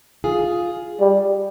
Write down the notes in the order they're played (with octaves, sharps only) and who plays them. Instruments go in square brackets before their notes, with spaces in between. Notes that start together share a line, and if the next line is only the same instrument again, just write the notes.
[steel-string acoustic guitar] F4 G#4
[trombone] G3